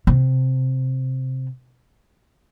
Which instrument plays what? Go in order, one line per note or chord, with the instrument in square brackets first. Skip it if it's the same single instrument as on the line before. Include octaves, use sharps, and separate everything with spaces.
[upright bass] C3